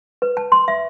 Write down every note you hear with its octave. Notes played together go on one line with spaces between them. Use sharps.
B4
A5
C6
E5